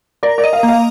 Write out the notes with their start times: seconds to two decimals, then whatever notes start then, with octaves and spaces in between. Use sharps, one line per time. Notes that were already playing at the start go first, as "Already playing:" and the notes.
0.23 A#4 D5
0.38 D5
0.44 D#5
0.53 F5
0.63 A#3
0.68 F5